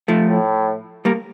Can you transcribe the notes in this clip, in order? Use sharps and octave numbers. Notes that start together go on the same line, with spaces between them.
F3 A3
A2
G3 A#3